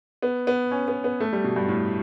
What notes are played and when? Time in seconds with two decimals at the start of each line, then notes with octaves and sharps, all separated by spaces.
0.22 B3
0.47 B3
0.71 C#4
0.88 B3
1.04 B3
1.20 A3
1.33 G3
1.44 B2
1.56 G2
1.68 A2